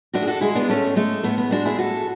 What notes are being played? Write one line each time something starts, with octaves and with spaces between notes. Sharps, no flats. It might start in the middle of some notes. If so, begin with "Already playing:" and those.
A2 D4 F#4
G#4
F#4 A4
G#3 E4 G#4
B3 D4
A2 A3 C#4
G#3 A3
A2 B3
B3
G#3 D4 F#4
E4 G#4
A2 F#4 A4